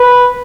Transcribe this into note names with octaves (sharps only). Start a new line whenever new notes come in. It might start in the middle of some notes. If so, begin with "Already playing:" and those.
Already playing: B4